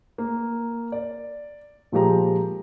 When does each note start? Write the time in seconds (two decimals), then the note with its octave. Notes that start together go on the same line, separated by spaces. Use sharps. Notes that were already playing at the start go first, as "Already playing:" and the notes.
0.18 A#3
0.92 D5
1.92 A#2 F3 G#3 G4 A#5